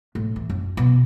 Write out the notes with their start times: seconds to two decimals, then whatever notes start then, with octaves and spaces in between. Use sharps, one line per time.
0.15 A2
0.36 E3
0.50 F#2
0.77 B2